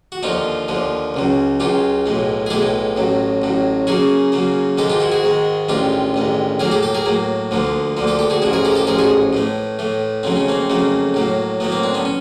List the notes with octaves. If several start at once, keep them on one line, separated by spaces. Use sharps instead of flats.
F#4
D#2 D3 F3 D#4 F4
D#2 D3 F3
C#2 C#3 F#3
C#2 C#3 F#3 F4 G4
B1 A2 E3 G#3
G#4
B1 A2 E3 G#3 G4 A4
A1 A2 F#3
A1 A2 F#3
F#2 C#3 F#3 A#3 F#4 G#4
F#2 C#3 F#3 A#3
G#2 D#3 G#3 G4 A4
F4 G4
E4 F#4
F#4 G#4
G#2 D#3 G#3
A1 G2 D#3 G#3 F4 G4
A1 G2 D#3 G#3
A2 F#3 A#3 G#4 A#4
G4 A4
G4 A4
G#4 A#4
A2 F#3 A#3
D2 D3 F3 A#3
D2 D3 F3 A#3
G4 A4
G4 A4
F#4 G#4
A1 G#2 F3 E4 F#4
G#4 A#4
G4 A4
A#4
G4 A4
A1 G#2 F3 G#4 A#4
F#4 G#4
A2 E3 A3
A2 E3 A3
F2 C#3 F#3 A3 C4
C#4
A#3 C4
F2 C#3 F#3 A3 A#3
A2 F#3 A#3
A2 F#3 A#3 B3
A#3 C4
C4 D4
B3 C#4
C#4